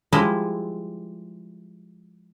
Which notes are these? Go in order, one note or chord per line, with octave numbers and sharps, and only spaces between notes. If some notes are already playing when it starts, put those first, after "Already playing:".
F3 G3 G#3 E4 D#5